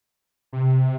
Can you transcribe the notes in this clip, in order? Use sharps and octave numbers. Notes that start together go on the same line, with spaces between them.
C3